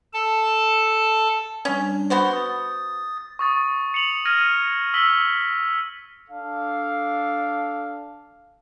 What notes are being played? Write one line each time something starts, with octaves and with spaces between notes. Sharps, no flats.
A4 A5
G3 C#4 D4
B3 F#4 C5
D#6 A6
C#6 D#6 A6
C#7 F7 F#7
F6 G#6 A#6 D#7
E6 B6 F#7 G7
D4 A4 F5